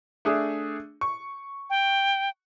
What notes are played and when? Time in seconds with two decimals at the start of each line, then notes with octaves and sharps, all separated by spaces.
0.25 A3 D4 G#4
1.01 C#6
1.70 G5